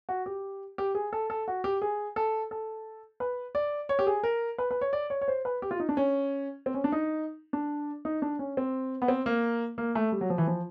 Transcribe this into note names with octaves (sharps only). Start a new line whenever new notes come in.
F#4
G4
G4
G#4
A4
A4
F#4
G4
G#4
A4
A4
B4
D5
C#5
G4
G#4
A#4
B4
B4
C#5
D5
C#5
C#5
C5
B4
G4
F4
D#4
D4
C#4
C4
C#4
D4
D#4
D4
D#4
D4
C#4
C4
B3
C4
A#3
A#3
A3
G3
F#3
F3
E3
F3